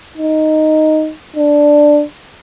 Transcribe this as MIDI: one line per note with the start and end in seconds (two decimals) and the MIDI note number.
0.17 1.12 63
1.36 2.03 62